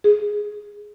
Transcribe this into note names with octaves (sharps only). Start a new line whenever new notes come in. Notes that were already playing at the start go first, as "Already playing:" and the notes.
G#4